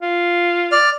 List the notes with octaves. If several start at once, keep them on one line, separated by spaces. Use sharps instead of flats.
F4
D5 F6